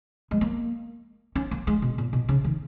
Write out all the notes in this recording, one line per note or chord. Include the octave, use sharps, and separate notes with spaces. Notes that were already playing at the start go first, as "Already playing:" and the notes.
G#3
A#3
C#4
A#3
G#3
B2
A#2
B2
C#3
D#3